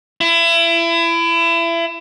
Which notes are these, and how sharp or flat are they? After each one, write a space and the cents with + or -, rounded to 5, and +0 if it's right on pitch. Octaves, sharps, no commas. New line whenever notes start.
E4 +30